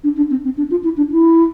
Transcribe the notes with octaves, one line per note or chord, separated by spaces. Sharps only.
D4
D4
C4
C4
D4
F4
E4
D4
E4